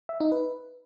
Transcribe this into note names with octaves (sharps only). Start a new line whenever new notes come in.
E5
D#4
B4